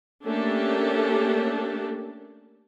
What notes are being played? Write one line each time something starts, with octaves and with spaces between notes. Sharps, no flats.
A3 A#3 C#4 D4 G4 A4